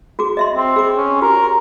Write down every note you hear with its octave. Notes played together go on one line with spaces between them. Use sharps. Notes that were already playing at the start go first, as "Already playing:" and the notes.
F#4 G#4 D6
D#5 E5 C6
C4
G#4 D6
C#4
F#4 G4 A#4